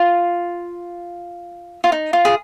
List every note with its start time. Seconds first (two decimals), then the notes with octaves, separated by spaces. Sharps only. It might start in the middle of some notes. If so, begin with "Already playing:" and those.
Already playing: F4
1.84 F4
1.92 D#4
2.13 F4
2.25 G#4